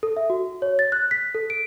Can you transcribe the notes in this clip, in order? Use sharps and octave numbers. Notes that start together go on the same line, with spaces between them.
A4
E5
F#4
C#5
A6
F#6
B6
A4
D7